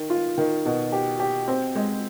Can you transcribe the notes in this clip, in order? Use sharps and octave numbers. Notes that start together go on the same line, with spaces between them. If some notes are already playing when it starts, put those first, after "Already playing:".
Already playing: D#3
F4
D#3
B2
G4
G4
C4
G#3